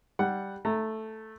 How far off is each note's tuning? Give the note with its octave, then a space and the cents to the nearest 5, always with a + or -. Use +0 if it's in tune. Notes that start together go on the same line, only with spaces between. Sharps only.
G3 +0 F#5 +5
A3 +0 A#5 -25